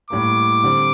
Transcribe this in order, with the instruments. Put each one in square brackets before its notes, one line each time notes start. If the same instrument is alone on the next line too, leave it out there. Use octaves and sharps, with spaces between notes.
[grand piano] A2 G3 A#3 [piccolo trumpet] D6
[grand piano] D3 G3 C4